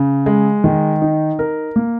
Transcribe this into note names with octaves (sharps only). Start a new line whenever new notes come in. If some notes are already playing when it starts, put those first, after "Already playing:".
Already playing: C#3
G#3
D#3
D#4
A#4
A#3